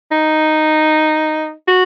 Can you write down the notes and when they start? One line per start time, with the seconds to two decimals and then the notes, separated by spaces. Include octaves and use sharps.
0.12 D#4
1.68 F#4